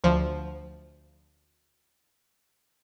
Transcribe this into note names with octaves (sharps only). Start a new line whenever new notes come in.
D2 F3